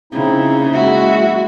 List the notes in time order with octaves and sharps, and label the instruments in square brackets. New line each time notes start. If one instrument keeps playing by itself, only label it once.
[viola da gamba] C#3 A#3 [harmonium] C4 D#4 E4
[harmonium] G#3 [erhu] E4 [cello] F#4